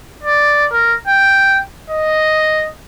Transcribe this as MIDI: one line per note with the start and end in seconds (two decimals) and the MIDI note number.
0.23 0.66 74
0.72 0.95 70
1.07 1.61 79
1.90 2.68 75